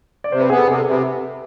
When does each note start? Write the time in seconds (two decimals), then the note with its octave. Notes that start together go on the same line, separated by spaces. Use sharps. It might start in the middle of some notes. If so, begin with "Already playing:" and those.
0.24 D5
0.32 C3 C5
0.41 B4
0.50 B3 G#4
0.58 A4
0.67 C3 G#4
0.79 A4
0.85 C3
0.91 B4